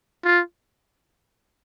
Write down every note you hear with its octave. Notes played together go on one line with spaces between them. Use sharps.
F4